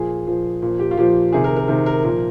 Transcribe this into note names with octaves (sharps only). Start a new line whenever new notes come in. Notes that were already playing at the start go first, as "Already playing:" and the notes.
Already playing: A#2 F3 G#4
A#2 F3
A#2 F3
G4
F4
A#2 F3 G4
C3 D#3 G#4
A#4
A#4
C3 D#3 A#4
A#4
A#2 F3 A#4